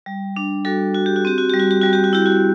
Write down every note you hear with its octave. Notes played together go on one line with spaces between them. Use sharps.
G3
D4
G3 F#4 A4
F#4
G4
F#4
C4 G4
F#4
G3 G4
F#4
G4
G3 F#4
G4
F#4
E4 G4
F#4